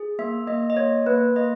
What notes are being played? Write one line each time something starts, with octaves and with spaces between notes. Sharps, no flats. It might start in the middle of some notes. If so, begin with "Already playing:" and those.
Already playing: G#4
A#3 E5
A#3 D#5
D#5
A#3 C#5
A#3 B4
A#3 D#5